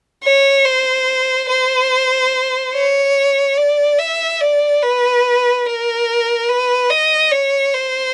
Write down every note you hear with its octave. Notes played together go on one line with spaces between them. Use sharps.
C#5
C5
C5
C#5
D5
E5
D5
B4
A#4
B4
D#5
C#5
C5